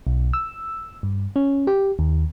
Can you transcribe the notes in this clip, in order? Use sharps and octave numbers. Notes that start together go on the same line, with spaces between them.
B1
E6
G2
C#4
G4
D#2